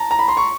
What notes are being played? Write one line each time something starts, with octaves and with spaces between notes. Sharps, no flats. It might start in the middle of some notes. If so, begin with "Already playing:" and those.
Already playing: A5 A#5
A#5
B5
C6
C#6